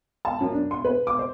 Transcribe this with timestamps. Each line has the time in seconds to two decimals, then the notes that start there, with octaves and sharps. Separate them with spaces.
0.25 A5
0.41 F#2
0.52 D4
0.71 C6
0.85 B4
1.07 D6
1.19 C5